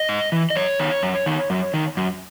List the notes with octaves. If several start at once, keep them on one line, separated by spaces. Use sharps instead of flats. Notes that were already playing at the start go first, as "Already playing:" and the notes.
Already playing: D#5
G#2
E3
D#5
F#2 C#5
D#3
F#2
D#3
F#2
D#3
F#2